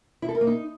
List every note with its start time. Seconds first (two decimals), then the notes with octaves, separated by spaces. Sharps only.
0.22 E4
0.29 A4
0.35 A#4
0.41 A#3
0.47 D#4